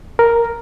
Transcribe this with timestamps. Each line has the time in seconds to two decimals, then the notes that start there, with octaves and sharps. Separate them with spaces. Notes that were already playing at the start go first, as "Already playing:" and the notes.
0.19 A#4